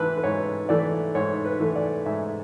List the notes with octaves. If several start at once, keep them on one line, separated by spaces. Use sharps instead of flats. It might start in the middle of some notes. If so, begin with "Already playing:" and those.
Already playing: G#2 E3 A3 A4 B4
B4
G#2 C#5
E3 A3 D5
G#2 C#5
B4
E3 A3
D5
G#2 E5